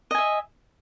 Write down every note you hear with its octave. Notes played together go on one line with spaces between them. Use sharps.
D#5 E5 G#5